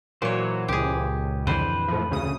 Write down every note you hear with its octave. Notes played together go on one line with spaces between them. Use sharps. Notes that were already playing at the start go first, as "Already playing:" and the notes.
A#2 E3 F#3 C5 C#5
C#2 G4 G#4
F2 D3 E3 B4 C5
A2 F3
D2 C#3 D#6